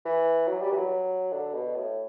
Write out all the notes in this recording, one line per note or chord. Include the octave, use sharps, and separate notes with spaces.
E3
F#3
G3
E3
F#3
D3
B2
A2